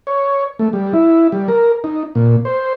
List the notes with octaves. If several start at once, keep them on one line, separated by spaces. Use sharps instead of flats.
C#5
A3
G3
E4
G3
A#4
D#4
A#2
C5